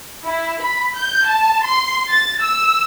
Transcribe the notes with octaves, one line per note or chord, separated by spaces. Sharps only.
E4
B5
G6
A5
C6
A6
E6